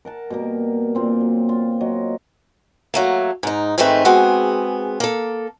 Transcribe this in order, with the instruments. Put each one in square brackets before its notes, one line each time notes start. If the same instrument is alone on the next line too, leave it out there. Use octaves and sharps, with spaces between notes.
[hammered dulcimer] A#4 F#5 A5
B2 G3 A#3 A#4
A#2 C4 F4
F#3
F4
F#3 D#5
[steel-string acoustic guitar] F#3 A3 A#3
G#2 D#4
G#2 D#3 G#3 A3 C4 B4
G#3 B3 C4 F#4 G#4
A#3 A4